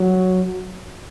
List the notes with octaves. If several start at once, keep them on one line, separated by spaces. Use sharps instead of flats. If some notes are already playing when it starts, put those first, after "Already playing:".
Already playing: F#3